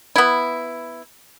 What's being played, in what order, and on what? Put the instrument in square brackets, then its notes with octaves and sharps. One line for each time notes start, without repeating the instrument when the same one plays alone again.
[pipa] B3 E4